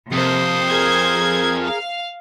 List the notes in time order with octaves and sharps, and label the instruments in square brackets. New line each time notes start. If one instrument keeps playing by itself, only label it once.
[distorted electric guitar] F2 [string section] C3 A#3 [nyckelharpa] C5 D#6
[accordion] G#4 A#4 [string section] G#6
[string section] F5